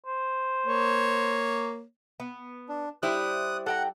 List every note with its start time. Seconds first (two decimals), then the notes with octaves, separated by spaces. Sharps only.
0.06 C5
0.66 A#3 C#5
2.20 B3
2.69 D4
3.03 G3 E4 C5 D#6 F#6
3.66 A4 F#5 G5 A#5